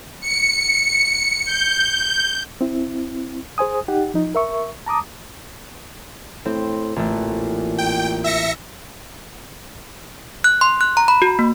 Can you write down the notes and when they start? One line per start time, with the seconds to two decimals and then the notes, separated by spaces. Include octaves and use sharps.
0.20 C#7
1.45 G6
2.61 C4 E4
3.58 G#4 C5 G#5 D#6
3.88 D#4 G4 F#5
4.14 F3 D#4
4.35 A#4 E5 C#6
4.86 A5 A#5 D6 D#6
6.45 A2 C4
6.96 A1 A#2 A3
7.78 G5
8.24 E5 A#6 C#7
10.44 F#6
10.61 C6
10.81 F#6
10.97 A#5
11.08 B5
11.22 F#4
11.39 A#3